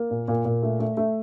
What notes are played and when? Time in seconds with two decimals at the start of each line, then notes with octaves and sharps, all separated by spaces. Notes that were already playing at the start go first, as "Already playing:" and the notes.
Already playing: A#3
0.11 A#2
0.28 A#2
0.45 A#2
0.63 A3
0.79 A3
0.97 A3